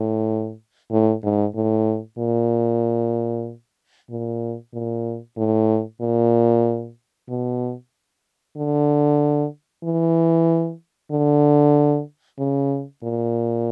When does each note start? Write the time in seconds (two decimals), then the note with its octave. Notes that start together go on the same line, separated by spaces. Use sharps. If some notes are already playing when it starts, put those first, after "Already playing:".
Already playing: A2
0.91 A2
1.24 G#2
1.55 A2
2.18 A#2
4.10 A#2
4.74 A#2
5.37 A2
6.01 A#2
7.29 B2
8.57 D3
9.84 E3
11.12 D3
12.39 C#3
13.04 A#2